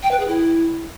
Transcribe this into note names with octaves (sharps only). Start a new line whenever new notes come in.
G5
B4
G#4
E4